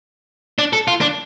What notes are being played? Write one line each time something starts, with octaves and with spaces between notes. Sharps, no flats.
D4
A4
F4
D4